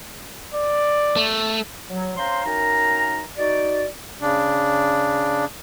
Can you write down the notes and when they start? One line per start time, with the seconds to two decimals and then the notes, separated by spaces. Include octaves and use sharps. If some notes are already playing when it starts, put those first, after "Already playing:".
0.54 D5
1.17 A3
1.90 F#3
2.17 C#4 C5 F5 A#5 C6
2.44 F#2 D#4 A#4 G#5 A#5
3.37 D#4 F#4 D5
4.22 C#3 D4